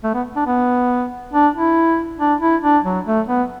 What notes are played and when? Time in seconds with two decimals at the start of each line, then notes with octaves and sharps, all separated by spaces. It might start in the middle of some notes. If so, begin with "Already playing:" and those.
0.04 A3
0.14 B3
0.36 D4
0.46 B3
1.33 D4
1.54 E4
2.19 D4
2.41 E4
2.63 D4
2.84 F#3
3.06 A3
3.27 B3